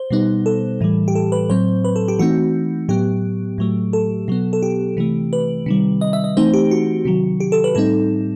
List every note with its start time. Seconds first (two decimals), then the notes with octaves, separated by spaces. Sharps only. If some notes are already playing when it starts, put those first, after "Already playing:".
Already playing: C5
0.11 B2 G3 B3 D#4
0.46 A4
0.81 A2 E3 G3
1.08 G4
1.15 A4
1.32 B4
1.50 A2 F#3 C4 C5
1.85 B4
1.96 A4
2.08 G4
2.19 E3 A3 C4 D#4 F#4
2.89 A2 F#3 B3 G4
3.58 A2 F#3 A3
3.93 A4
4.28 B2 F#3 B3
4.53 A4
4.62 G4
4.97 C3 E3 A3
5.33 B4
5.66 C3 D#3 G3
6.01 D#5
6.13 E5
6.24 D#5
6.37 E3 A3 C4 D#4 C5
6.54 G4
6.71 F#4
7.05 C3 D#3 F#3
7.40 G4
7.52 A4
7.64 B4
7.75 A2 G3 C4 D#4 A4